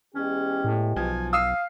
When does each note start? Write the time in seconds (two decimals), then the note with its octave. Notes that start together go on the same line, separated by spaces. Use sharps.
0.15 E2 G#3 C#4 G4
0.64 A2
0.96 B1 F3 G#5
1.33 F5 D#6 E6 C7